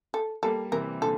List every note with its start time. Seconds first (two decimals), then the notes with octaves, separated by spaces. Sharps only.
0.14 A4
0.43 G3 A#3 A4
0.72 C3 E3 A#4
1.01 A#2 D3 A4